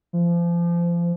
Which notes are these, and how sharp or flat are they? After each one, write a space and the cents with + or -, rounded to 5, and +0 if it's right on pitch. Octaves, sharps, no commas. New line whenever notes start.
F3 -30